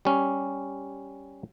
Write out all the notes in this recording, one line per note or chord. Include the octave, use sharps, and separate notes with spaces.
G3 C#4